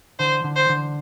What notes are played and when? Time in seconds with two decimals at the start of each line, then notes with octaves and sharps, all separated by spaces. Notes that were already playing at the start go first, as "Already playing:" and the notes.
0.19 D3 C5
0.44 D3
0.56 C5
0.69 D3